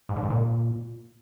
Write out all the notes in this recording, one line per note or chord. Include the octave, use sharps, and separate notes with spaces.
G#2
D3
G#2
A#2